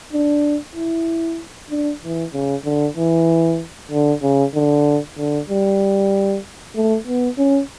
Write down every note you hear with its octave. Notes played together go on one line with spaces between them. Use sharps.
D4
E4
D4
E3
C#3
D3
E3
D3
C#3
D3
D3
G3
A3
B3
C#4